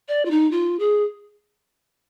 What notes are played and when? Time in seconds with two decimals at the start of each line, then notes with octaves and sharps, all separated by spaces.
0.08 D5
0.25 F4
0.31 D#4
0.51 F4
0.79 G#4